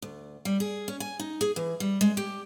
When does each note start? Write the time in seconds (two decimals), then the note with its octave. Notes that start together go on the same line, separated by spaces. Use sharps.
0.02 D2
0.45 G3
0.60 G#4
0.88 C#4
1.00 G#5
1.20 D#4
1.41 G#4
1.56 E3
1.80 G3
2.01 G#3
2.17 G4